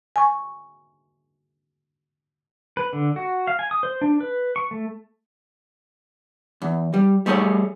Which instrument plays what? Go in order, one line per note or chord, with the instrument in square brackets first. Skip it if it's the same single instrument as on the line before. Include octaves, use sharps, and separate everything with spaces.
[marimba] G#5 C#6
[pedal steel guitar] B4
D3
F#4
F5
G#5
D#6
C5
D4
B4
C#6
A3
[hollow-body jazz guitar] E2
G3
G3 A3 G#4 A#4 C#5